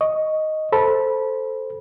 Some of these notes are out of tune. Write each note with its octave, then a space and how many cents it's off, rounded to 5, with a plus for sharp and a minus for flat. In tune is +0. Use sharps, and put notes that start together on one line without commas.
D#5 +0 C#6 +0
A4 +0 C5 +0 B5 -20